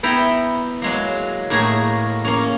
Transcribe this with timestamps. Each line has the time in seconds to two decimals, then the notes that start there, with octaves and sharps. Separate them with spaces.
0.03 B3 E4 G5 A#5 B5
0.82 F#3 G#3 A#3
1.50 A2 A#3 F#4 G#4 A#4 G#5
2.25 A#3 C#4